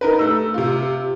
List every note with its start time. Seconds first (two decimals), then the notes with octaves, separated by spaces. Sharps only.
0.01 D#4 A#4 B4
0.19 A3 E6
0.54 C3 F4